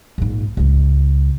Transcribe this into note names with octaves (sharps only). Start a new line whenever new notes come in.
A#1 G#2
C#2 G#3